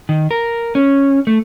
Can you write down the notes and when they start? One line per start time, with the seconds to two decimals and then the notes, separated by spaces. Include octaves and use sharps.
0.09 D#3
0.31 A#4
0.75 C#4
1.27 A3